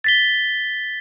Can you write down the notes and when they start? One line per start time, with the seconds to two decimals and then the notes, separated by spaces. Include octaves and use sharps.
0.04 A6 B6 G7